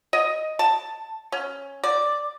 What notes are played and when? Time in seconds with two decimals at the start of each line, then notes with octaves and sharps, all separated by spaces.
0.13 D#5
0.59 A5
1.32 C#4
1.84 D5